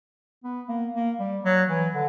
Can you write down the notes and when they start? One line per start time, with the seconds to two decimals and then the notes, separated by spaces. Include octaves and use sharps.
0.44 B3
0.68 A#3
0.94 A#3
1.20 G3
1.44 F#3
1.69 E3
1.94 D3